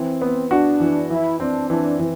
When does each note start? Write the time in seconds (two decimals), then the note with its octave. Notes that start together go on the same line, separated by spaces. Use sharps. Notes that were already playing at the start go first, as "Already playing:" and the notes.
Already playing: E3 C4
0.22 B3
0.51 D4 F#4
0.80 E3
1.10 E3 E4
1.40 C4 D4
1.70 E3 D4
1.99 E3